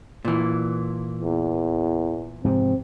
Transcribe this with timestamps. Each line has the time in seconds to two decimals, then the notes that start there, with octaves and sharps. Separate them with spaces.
0.25 A#2 E3
1.21 E2
2.44 G#2 C3 F3 C4